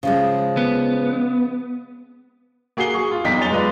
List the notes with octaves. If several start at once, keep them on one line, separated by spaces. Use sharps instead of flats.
C#3 F3 G#3
B3
A#3 F#4 G#4 D#6 C7 G7
G#4 C#6
F4
B1 E2 D#4 G5 B6
F#2 C#5 G#5 A6 F7 G7
G#3 F4 B4 D5 D#5